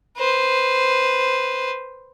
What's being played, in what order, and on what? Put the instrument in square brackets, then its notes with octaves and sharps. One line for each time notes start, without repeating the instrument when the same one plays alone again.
[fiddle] B4 C5